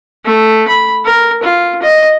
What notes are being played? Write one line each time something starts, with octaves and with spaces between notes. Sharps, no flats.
A3
B5
A#4
F4
D#5